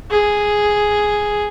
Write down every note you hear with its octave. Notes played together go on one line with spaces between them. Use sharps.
G#4